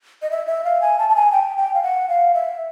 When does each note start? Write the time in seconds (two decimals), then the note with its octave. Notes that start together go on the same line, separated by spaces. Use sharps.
0.22 D#5
0.31 E5
0.47 E5
0.64 F5
0.82 G#5
0.99 A5
1.10 A5
1.16 G#5
1.32 G5
1.57 G5
1.74 F5
1.83 F#5
2.09 F5
2.34 E5